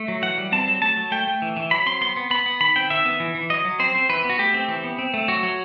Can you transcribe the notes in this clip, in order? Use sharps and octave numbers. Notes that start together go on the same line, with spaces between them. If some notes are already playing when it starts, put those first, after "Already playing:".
Already playing: A3
F#3
E3 F#5
G3
C4 A5
F#3
A3 A5
F#3
A3 G5
A3
E3
E3
F#3 B5
C4 C6
B3 C6
B3
B3 B5
B3
D#3 B5
C4 G5
D#3 E5
B3
E3
E3
F#3 D#5
F#3
C4 C5
C4
E3 B4
B3
F#4
A3 G4
C4
E3
B3
C4
A3
F#3 F#4
F#3